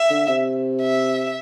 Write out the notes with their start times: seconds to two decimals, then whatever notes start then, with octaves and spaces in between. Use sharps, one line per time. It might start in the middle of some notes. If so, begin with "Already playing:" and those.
Already playing: E5
0.10 D3
0.28 C3
0.82 E5